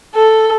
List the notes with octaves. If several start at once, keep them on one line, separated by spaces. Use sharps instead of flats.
A4